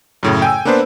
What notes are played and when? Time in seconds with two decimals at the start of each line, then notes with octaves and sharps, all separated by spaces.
0.23 F#2 A2 C#3
0.42 G5 G#5 E6
0.65 A#3 B3 D4 B4 C5